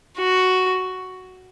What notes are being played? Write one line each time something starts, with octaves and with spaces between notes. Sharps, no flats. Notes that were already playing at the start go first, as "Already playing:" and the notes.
F#4